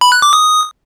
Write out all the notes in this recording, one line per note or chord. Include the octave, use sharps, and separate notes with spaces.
B5
F#6
D6
D#6